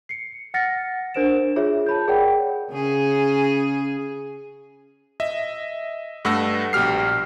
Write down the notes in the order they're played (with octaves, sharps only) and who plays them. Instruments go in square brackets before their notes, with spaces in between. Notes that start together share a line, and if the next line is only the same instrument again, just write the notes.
[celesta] C7 C#7
F#5 F6 A6 A#6 C#7
D4 A#4 C5 D7 E7
F4 G#4 C#5 E5
A5 B5 G6
G#4 A#4 C#5 D5 F#5 G5
[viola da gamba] C#3 G#4
[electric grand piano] D#5 E5
G2 A3 F#5 E6 A#6
A#1 B2 G4 F6 C7